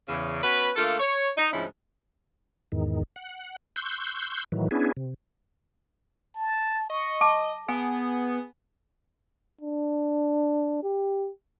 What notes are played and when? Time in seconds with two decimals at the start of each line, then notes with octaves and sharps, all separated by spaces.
0.09 E2 C#3
0.44 B3 C#4 F#4 B4
0.76 D3 A3 A#3 F4 A4
1.00 C#5
1.37 D#4
1.53 D2 G#2 F3 C#4 D#4 E4
2.72 E2 G#2 D#3
3.16 F#5
3.76 C6 C#6 E6 F#6 G6
4.52 A2 D#3 E3 F#3
4.71 B3 C#4 D4 E4 G#4
4.97 C3
6.36 A5
6.90 D#5 C#6
7.21 A5 D6
7.68 B3 G#4 G#5
9.61 D4
10.83 G4